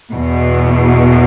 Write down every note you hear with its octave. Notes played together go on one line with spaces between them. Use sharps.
E2 B2